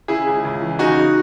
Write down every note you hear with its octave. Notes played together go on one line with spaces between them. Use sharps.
C#3 E4 G#4
C#2
C#2
E3
C#3 D#4 F#4